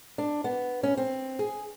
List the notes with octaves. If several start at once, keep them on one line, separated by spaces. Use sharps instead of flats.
D4
B3
C#4
C4
G#4